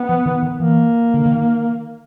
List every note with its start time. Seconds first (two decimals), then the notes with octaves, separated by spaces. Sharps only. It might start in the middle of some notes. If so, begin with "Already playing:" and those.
Already playing: B3
0.09 F3
0.26 D#3
0.42 D#3
0.60 E3 A#3
1.14 D3
1.26 D#3